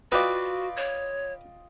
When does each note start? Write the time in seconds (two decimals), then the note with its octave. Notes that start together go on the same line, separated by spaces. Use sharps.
0.12 F4 F#4 B4 D5 D#5 G5
0.77 C#5